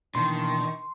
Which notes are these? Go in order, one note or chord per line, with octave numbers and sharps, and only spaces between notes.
B2 D#3 E3 A#3 D4 A5 C6